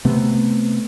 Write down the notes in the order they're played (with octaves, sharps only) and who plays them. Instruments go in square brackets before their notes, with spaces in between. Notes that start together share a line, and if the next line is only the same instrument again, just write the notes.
[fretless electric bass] C3 A3 B3